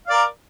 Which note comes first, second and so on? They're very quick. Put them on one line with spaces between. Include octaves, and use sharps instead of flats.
F5 D5 A#4